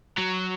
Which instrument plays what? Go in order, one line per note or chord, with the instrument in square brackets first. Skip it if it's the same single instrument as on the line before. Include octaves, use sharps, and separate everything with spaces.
[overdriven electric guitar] F#3